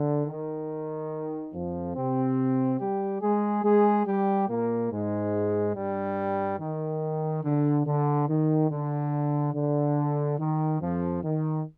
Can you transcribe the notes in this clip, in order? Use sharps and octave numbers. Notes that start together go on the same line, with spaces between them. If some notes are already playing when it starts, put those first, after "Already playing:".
Already playing: D3
D#3
F2 F3
C3 C4
G3 G4
G#3 G#4
G#3 G#4
G3 G4
A#2 A#3
G#2 G#3
G2 G3
D#3
D3
D3
D#3
D3
D3
D#3
F2 F3
D#3